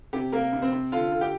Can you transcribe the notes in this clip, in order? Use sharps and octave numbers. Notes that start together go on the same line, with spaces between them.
C3 G4
C3 A#3 A#4
C3
C4 C5
C3
D3 F4 F5
D3
G4 G5